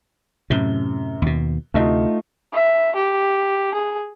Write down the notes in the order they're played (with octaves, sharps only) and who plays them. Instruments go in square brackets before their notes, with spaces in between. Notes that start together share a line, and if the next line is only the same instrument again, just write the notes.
[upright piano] F#2 G7 [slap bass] A2 C3
[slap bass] D#2 B2
[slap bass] D2 C3 [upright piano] A3 D#4 F4
[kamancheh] E5
G4
G#4